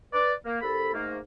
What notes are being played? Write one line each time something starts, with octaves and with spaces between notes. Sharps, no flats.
B4 D5
A#3
C2 A4 B5
G#2 A3 A#3